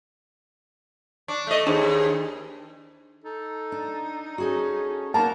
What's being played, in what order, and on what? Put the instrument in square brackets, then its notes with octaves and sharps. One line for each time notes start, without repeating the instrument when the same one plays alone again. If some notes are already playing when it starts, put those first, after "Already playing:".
[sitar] D4 [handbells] C#6
[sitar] A3 D#5
[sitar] D#2 [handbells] D4 G#4 C5
[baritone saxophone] D#4 [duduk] A4
[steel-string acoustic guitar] D4
[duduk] C#4 [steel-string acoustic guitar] F#4 G#4 A4
[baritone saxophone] A#3 [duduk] B3 [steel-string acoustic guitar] D#4 A#5 [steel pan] A5